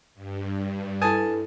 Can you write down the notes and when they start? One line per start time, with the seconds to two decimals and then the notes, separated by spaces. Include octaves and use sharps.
0.14 G2
1.02 E4 A4 B4 G#5 A5 D#6